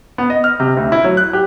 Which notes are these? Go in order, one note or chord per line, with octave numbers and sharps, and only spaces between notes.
B3
D#5
F6
C3
D2
E4
F#3
F#6
G4